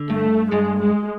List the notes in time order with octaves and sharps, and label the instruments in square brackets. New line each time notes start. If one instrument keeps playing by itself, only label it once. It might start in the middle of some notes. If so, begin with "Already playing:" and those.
Already playing: [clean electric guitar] D3
[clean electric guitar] G2 [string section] A3
[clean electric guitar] G2 [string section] G#3
[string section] G#3